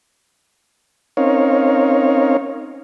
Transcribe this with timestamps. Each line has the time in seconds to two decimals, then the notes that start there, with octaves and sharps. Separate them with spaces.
1.17 C4 C#4 D#4 A#4 C#5 F5